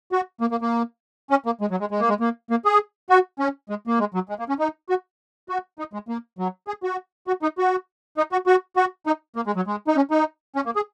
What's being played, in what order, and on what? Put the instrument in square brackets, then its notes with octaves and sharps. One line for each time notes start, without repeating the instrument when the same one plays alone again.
[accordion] F#4
A#3
A#3
A#3
C#4
A#3
G#3
F#3
G#3
G#3
A#3
G#3
A#3
A#3
G#4
F#4
C#4
G#3
A#3
G#3
F#3
G#3
A#3
C#4
D#4
F#4
F#4
D#4
G#3
A#3
F#3
G#4
F#4
F#4
D#4
F#4
D#4
F#4
F#4
F#4
D#4
A#3
G#3
F#3
G#3
D#4
C#4
D#4
C#4
A#3
G#4